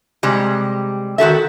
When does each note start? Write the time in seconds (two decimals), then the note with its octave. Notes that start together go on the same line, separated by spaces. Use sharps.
0.23 C3 G3 G#3
1.18 D#3 F#4 A4 E5